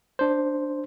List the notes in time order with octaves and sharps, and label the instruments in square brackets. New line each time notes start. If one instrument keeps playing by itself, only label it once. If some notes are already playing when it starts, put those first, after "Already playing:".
[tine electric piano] D4 C5